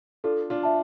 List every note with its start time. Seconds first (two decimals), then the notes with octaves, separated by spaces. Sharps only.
0.24 D4 F4 A4
0.50 D4 F4
0.63 E5 A5